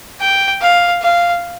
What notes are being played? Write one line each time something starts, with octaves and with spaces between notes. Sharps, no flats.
G5
F5
F5